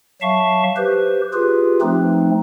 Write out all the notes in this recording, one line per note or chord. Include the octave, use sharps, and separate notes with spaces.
F#3 E5 F5 A5 C#6
G4 B4 C5
F4 G4 G#4 B4
F3 A3 C4 D#4